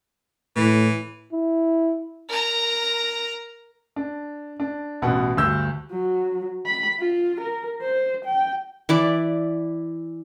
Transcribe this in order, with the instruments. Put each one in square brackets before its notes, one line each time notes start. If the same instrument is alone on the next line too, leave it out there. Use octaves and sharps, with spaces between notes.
[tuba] A2 [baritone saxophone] E3
[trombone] E4
[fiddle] A#4 A#5
[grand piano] D4
D4
A1 B2 F#5
D2 G2 E6 G6
[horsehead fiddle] F#3
B5
F4
A#4
C5
G5
[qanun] E3 E4 D5